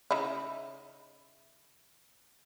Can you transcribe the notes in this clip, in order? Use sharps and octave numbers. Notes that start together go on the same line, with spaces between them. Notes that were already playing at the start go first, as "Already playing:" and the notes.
C#3 D#4 E4